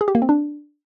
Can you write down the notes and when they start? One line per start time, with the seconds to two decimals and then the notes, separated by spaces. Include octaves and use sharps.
0.01 G#4
0.08 G4
0.15 A#3
0.22 C4
0.29 D4